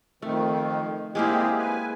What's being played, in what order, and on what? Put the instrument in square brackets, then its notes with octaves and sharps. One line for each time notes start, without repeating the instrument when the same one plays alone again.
[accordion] F2 D#3 [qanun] A3
[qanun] G#3 A#3 E4 [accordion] C4 G4 G#4
[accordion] B4 G#5